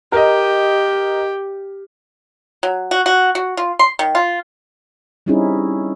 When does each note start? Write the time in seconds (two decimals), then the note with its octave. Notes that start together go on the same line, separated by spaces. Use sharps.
0.12 G4 A#4 D#5
2.63 F#3
2.91 F#4
3.06 F#4
3.35 F#4
3.57 F4
3.79 C6
3.99 D#3
4.15 F4
5.26 G3 C4 C#4 D#4 E4 G#4